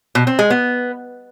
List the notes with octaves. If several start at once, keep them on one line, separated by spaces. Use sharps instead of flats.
B2
C4
G#3
B3